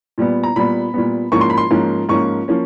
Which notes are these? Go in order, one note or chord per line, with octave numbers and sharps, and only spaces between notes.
A#2 G3 B3
A#5
A#2 G3 B3 B5
A#2 G3 B3
G#2 F3 A#3 C#4 C#6
C6
B5
C6
G#2 F3 A#3 C#4
G#2 F3 A#3 C#4 C#6
F3 A#3 C#4